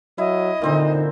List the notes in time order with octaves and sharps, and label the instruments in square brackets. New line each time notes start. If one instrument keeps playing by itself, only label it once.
[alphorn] F#3 [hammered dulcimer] E4 [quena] D#5
[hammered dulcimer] A#2 C4 C5 [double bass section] D3 [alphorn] D#4